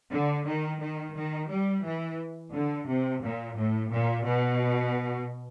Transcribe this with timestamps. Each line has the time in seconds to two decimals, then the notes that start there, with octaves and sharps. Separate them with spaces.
0.11 D3
0.46 D#3
0.81 D#3
1.15 D#3
1.49 G3
1.84 E3
2.53 D3
2.88 C3
3.23 A#2
3.57 A2
3.92 A#2
4.26 B2